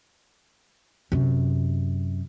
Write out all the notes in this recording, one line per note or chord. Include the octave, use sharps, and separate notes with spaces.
F#2 C3